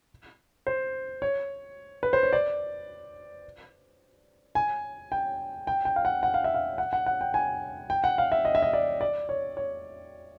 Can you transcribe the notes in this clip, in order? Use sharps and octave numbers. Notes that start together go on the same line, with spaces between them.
C5
C#5
B4
C5
C#5
D5
G#5
G5
G5
G5
F5
F#5
F#5
F5
E5
F5
F#5
F#5
F#5
G5
G#5
G5
F#5
F5
E5
D#5
E5
D#5
D5
D5
C#5
C#5